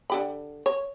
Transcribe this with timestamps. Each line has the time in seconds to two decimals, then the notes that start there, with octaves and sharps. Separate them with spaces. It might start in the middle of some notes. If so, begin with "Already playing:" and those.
0.10 D3 G4 B5
0.66 C#5